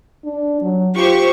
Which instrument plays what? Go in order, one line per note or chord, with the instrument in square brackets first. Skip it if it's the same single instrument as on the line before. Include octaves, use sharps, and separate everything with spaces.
[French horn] D4
F#3
[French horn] F4 [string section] G4 C5 C#6